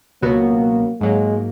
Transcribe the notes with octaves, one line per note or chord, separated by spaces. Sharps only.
C#2 B2 F#3 A#3 B3 F#4
G#2 F#3 G#3 A#3